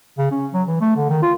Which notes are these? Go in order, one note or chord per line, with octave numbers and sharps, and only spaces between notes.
C#3
C#4
F#3
E3
A3
D3
D#3
F4